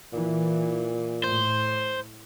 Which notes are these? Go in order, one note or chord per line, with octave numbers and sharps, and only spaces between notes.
A#2 E3
A2 C5